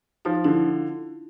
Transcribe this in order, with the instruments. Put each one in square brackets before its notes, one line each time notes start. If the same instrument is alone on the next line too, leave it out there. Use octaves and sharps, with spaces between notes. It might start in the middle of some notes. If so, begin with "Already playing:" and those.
[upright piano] F3 [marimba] D#4 F4
[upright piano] D3 [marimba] D4 E4